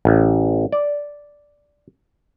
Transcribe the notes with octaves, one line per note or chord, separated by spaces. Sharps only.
A1
D5